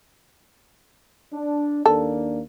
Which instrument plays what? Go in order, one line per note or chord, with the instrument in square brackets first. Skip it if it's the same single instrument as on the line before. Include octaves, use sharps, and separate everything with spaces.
[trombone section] D4
[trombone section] D#2 A#3 D4 [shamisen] A4